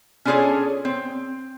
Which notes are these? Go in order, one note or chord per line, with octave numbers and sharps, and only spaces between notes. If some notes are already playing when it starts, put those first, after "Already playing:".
C#4 D4 F4 G#4 A4 C#5
C4